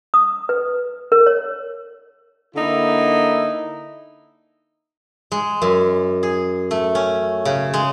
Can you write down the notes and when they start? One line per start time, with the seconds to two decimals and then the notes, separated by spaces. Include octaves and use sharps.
0.14 D#6
0.49 B4
1.12 A#4
1.26 C#5
2.55 D3 A#3 D#4 E4
5.32 G#3
5.62 F#2
6.23 G#4
6.71 A3
6.95 C#4
7.45 C#3
7.74 G#3